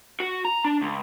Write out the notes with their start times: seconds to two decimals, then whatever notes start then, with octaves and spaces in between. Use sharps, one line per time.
0.20 F#4
0.45 A#5
0.65 D4
0.81 C#2